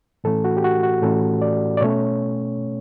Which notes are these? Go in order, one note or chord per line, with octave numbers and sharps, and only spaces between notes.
A2 E3 A3 C#4 A4
F#4
G4
F#4
F#4
A2 E3 A3 C#4 A4
D5
D5
B2 A3 C#4 C#5